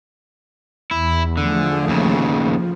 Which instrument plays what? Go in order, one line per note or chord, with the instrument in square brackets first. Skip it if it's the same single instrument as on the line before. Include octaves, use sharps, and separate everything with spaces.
[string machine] E2 [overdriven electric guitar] E4
[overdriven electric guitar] D3 [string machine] F3 A3 G#4
[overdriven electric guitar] D#2 C#3
[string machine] F3